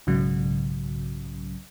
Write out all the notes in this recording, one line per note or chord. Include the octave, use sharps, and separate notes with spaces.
B1 G#2 C#3 F#3